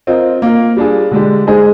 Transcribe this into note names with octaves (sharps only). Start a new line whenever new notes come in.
C4 F4 A#4 D#5
A#3 F4 A#4
G3 D4 F4 G#4
D3 G#3 D4 G4
G#3 D#4 G#4 C5 D#5